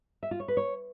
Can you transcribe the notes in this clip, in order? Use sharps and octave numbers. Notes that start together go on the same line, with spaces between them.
E5
F4
C#5
B4
C#5